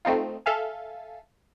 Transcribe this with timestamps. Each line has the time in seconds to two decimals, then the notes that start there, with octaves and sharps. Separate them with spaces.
0.05 A3 C4 D#4 F4
0.46 A4 E5 F5 G#5